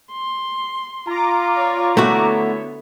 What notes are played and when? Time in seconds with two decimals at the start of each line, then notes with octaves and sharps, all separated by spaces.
0.12 C6
1.07 F4 A#5 D6
1.54 C#5 D5
1.97 D3 A3 B3 E4 F#4 C#5 E5